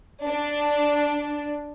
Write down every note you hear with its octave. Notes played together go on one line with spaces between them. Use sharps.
D4